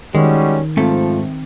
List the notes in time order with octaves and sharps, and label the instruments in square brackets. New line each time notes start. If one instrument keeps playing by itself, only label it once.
[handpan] D#3 [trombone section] G3 C#4 F#4 [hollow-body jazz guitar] G#3
[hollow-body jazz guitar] G#2 A3 [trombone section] F3 F4 [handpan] C4